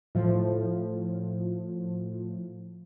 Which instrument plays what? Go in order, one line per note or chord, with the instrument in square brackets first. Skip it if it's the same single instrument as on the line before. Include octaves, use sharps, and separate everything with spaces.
[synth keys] A2 F3